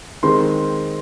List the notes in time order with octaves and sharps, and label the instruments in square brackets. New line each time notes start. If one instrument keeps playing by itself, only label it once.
[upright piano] D#3 G#3 C4 C6